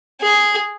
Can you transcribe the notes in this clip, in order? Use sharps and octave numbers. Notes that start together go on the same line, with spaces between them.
G#4